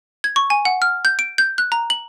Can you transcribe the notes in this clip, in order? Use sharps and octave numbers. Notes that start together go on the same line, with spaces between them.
G#6
C#6
G#5
F#5
F6
G6
D7
G6
F#6
A#5
F#7